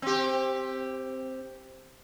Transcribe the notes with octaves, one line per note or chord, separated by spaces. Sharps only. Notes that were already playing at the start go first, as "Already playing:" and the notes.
C4 G4